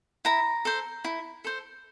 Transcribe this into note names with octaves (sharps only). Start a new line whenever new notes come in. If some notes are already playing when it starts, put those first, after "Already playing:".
E4 A#5
A4 C5
E4
A4 C5